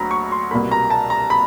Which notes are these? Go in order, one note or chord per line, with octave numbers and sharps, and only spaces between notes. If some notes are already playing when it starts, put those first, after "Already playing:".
Already playing: D2 F#3 A#5 B5
C#6
C6
C2 B2 G3 A#3 B5
A#5
A5
A#5
B5